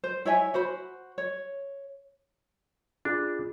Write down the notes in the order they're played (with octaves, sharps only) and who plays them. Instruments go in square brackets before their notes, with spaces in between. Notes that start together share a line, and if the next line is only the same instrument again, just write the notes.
[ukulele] C5
E4 C#5 E5 G#5
F#4 C5 B5
C#5
[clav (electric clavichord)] D4 [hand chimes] F4 G#4